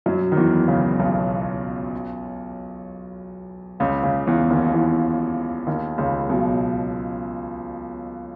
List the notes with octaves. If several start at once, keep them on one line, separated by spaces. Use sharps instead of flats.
F#2 F#3
D#3
E2 E3
C#2 C#3
B1 B2
C#2 C#3
C#2 C#3
E2 E3
D#2 D#3
E2 E3
D#2 D#3
C#2 C#3
B1 B2